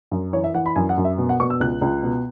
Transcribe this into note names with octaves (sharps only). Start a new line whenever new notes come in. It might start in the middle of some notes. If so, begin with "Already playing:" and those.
F#2
E3 C#5
E5
E3 F#5
B5
F#2 G#5
F#5
F#2
E5
B2
F#5
B2 C#6
E6
C#2 F#6
C#2
B2